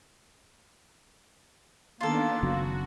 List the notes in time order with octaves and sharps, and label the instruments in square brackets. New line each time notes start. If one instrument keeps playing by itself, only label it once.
[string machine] D#3 B3 D4 [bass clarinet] A#3 [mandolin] F4 A4
[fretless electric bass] F#1 C#3 F#3 [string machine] F#4